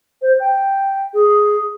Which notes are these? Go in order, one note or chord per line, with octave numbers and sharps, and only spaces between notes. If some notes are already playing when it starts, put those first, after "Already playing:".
C5
G5
G#4